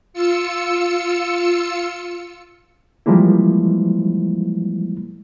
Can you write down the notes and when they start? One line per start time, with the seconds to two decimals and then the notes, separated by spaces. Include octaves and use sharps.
0.13 F4 E6 C#7
3.06 E3 F3 G3 G#3 A#3 E4